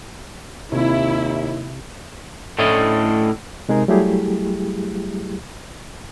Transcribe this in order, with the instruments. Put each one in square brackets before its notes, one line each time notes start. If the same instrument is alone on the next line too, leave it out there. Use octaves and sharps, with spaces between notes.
[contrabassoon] D#2 [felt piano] C3 [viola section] E4
[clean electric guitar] A2 A3 C#4 D4 E4 D#5
[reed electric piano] C3 G#3 D#4 G#4 A#4
F#3 G3 A3 E4 G4 G#4